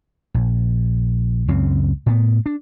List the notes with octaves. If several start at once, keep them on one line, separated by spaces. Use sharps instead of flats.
A#1
C#2 F#2 C#3 C4
A2 B3
D4